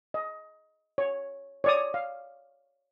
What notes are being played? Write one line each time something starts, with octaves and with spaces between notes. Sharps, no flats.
D#5
C#5
C#5 D5 D#6
F5